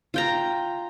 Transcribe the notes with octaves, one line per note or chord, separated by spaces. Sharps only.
F4 G5 A#5